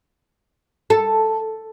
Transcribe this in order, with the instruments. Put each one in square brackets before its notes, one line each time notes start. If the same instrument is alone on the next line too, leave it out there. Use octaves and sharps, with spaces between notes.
[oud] A4